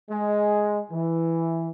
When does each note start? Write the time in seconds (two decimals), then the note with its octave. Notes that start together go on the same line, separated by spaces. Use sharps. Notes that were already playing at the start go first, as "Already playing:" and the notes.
0.10 G#3
0.91 E3